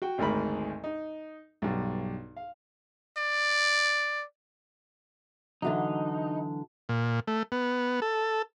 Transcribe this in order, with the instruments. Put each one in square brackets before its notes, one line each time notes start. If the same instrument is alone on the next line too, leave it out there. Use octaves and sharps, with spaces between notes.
[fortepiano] F#4 G5
G#1 D2 G#2 A#4 B5
D#4
B1 G2
F5
[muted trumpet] D5
[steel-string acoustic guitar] D3 E3 F#3 [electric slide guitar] D#4
[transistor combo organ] A#2
A3
B3
A4